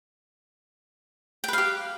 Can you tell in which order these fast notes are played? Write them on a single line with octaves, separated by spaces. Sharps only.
G5 B4 F5 G4